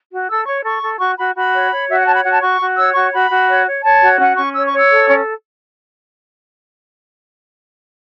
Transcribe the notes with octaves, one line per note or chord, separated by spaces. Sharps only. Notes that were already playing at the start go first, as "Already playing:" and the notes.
F#4
A4 E6
C#5 C#6
A4 C#6
A4
F#4 C#6
F#4 B5
F#4 B5
C#5
C#5
F#4 E5
F#5
C#5 A5
B5
F#4 F#5
A5
F#4 C#6
F#4
C#5 E6
F#4 C#6
F#4 B5
F#4
C#5
C#5
C#5 A5
F#4
C#4 F#5
C#4 C#6
C#5 E6
C#6
C#5
E6
A4
C#4